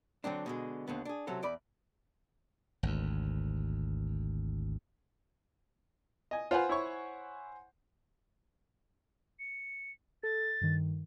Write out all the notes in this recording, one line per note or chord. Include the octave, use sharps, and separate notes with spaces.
D3 F#3 C4 D4
B2 D3 G#3
D#2 D3 B3
D4 G#4
C3 F#3 C#4 A4
E2 D5 B5
G#1 D2
D#5 G#5
F4 B4 C5 F#5 G#5
E4 C#5 C#6
C#7
A4 A6
G2 D#3